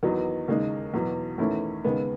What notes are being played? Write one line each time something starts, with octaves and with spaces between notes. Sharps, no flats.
E2 D#3 F#3 B3 D#4
D#2 C#3 G#3 D#4
E2 B2 F#3
E2 D#3 A3 C#4 E4
D#2 C#3 G#3 B3